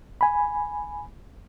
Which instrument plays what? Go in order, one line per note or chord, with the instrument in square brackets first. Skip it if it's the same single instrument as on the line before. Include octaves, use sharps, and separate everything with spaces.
[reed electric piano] G#5 B5